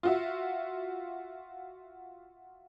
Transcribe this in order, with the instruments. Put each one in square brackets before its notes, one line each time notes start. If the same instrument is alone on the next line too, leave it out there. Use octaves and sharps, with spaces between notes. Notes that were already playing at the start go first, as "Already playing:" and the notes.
[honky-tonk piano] F4 F#4 E5